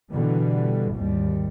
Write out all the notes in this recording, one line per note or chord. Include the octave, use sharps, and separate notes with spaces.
B2 D3 E3 G3
G#1 D#2 G3